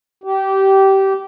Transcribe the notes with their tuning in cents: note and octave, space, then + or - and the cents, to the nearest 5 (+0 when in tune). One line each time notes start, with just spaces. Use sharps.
G4 -20